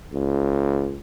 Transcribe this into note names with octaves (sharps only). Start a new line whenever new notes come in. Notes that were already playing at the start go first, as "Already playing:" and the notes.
C#2